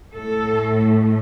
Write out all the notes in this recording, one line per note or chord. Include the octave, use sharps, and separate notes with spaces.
A2 A3 A4